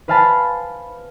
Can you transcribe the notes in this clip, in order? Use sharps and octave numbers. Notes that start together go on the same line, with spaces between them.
B4 C5 F5 G#5 A5 B5